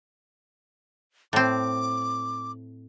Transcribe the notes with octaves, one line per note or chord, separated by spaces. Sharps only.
A2 C4 D6